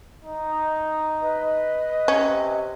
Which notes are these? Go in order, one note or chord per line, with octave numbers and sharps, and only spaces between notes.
D#4
B4 D#5
C3 C#4